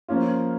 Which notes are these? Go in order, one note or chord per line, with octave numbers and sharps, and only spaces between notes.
F3 A#3 C#4 F4